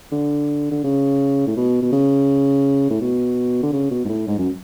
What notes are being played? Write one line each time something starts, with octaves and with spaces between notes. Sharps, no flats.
D3
D3
C#3
A2
B2
B2
C#3
A2
B2
D3
C#3
B2
G#2
A2
G#2
F#2